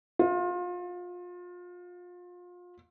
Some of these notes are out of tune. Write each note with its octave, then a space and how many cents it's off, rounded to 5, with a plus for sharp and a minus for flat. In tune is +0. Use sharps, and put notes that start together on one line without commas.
F4 +30 E5 +0